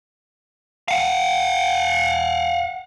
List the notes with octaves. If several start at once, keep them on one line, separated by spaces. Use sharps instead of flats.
F5 F#5